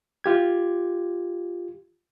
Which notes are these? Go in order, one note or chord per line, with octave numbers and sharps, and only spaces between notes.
F4 G4 G#6